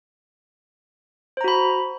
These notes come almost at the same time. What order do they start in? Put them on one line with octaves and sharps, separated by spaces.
C5 A#5 F#4 B5